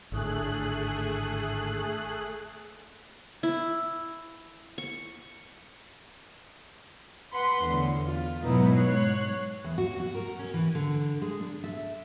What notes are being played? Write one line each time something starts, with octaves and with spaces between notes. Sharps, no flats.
G#1 A2 D3 A3 G#4 F#6
E4
C#6
B4 F#5 B5 C6
E2 A2 D3
F4
G#2 B2 F#3 B3 D#4 E4
G#2 C#5 F#6 C7
E2
F#4
F#4
A#4
C#4
E3
D3
G#3
D4
E5